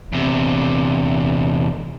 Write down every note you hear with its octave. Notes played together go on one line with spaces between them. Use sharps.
E2 C3